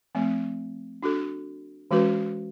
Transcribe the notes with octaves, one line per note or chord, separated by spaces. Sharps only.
F3 A3 C4
D4 F#4 A4
E3 G#3 C#4 F#4 B4